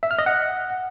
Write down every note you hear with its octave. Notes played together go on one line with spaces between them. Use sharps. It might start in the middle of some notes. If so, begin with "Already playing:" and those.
E5
F6
D#5
F#5